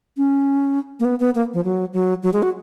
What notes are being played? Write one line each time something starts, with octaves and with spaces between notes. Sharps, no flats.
C#4
A#3
B3
B3
A#3
F3
F#3
F#3
F#3
G#3
F#4